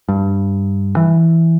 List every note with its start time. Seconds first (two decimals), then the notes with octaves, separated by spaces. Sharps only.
0.09 G2
0.97 E3